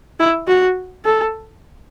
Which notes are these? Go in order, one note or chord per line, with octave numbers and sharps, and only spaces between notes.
E4
F#4
A4